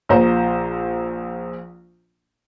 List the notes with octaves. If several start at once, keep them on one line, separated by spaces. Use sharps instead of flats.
A#1 A#2 C5 A#5